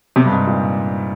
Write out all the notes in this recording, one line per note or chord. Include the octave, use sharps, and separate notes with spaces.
C3
G2
G#2
A#2